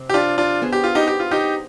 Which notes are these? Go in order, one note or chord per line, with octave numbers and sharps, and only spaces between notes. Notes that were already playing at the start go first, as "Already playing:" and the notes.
Already playing: C3
G4
D4 F4
D4 F4
B3 D4 G#4 C5
G4
F4
D#4 G4
G4
F4
D#4 G4